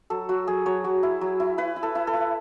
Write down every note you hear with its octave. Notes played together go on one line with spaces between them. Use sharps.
F#3 A4
F#3 F#4
F#3 G#4
F#3 C#5
F#3
E4
F#3
E4
E4 B4
E4
A4
E4
A4
E4